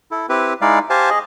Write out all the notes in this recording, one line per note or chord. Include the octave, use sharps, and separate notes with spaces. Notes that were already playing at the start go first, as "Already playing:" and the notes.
E4 A4
C4 E4 G4 B4
G#3 D#4 E4 D5 F5
G4 C5 F5 G#5 A5
G#4 D#5